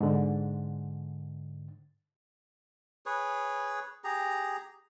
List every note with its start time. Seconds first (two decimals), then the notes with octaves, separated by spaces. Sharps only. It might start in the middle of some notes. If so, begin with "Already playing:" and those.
0.01 G#2 D3
3.06 G#4 B4 C#5
4.04 G4 G#4 A#5